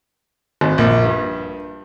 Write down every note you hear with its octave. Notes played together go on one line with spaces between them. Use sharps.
G#1
A#1
G2